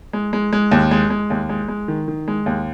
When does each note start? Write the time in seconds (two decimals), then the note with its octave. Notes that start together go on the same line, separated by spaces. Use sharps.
0.13 G#3
0.33 G#3
0.53 G#3
0.71 D#2
0.91 G#3
1.10 G#3
1.30 D#2
1.49 G#3
1.68 G#3
1.88 D#3
2.08 D#3
2.28 G#3
2.46 D#2